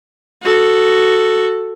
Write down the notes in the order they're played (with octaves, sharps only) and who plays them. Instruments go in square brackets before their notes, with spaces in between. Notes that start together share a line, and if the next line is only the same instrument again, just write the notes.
[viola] F#4 A4